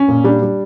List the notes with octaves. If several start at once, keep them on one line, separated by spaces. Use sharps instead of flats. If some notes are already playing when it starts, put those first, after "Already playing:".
Already playing: C#4
A#2
G3 D4
G3